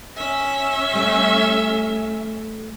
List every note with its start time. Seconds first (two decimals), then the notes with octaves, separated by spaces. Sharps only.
0.16 C#4 E5
0.93 G3 A3